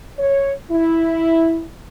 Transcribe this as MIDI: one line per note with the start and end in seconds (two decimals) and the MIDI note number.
0.18 0.52 73
0.71 1.64 64